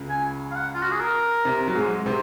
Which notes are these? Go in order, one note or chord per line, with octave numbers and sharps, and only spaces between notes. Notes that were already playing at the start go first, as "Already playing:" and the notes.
Already playing: C#2 C#3
G#5
F5
F#5
F4
F#4
G#4
A#4
C3
F#3
G#2 G#3
C3 C4